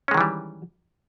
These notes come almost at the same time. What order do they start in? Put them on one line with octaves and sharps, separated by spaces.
C#4 G#3 D#3 E3 G3